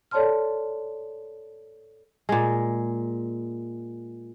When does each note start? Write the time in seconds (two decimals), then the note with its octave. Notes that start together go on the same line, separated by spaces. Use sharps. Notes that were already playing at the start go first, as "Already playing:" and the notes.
0.11 A4 C#5 D5 A5 C6 F6
2.29 A#2 G#3